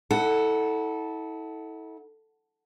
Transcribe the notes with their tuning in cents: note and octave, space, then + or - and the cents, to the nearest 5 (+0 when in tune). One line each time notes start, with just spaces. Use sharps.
E4 -35 A4 +0 F#5 +0